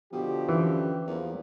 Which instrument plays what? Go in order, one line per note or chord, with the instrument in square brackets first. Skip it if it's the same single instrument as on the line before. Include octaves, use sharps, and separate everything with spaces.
[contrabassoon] B2 [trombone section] D3 F3 G4
[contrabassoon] F#2 [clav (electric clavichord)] E3
[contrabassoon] E2 [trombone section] F3 A#3